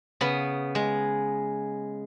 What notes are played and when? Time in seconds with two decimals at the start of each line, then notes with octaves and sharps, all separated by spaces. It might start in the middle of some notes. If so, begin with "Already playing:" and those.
0.21 C#3 B3
0.75 G#3